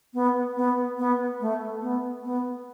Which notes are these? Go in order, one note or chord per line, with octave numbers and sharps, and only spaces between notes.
B3
B3
B3
A3
B3
B3